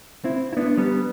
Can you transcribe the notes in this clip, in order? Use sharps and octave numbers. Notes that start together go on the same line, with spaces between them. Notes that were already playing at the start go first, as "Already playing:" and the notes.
C4 E4
E4
B3 D4
G3 B3